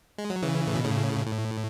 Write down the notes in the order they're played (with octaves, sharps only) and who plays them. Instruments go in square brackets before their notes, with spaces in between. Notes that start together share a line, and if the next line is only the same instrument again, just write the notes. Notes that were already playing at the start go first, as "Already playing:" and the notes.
[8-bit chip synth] G#3
F#3
C#3 E3
A2
B2
A2 C#3
A2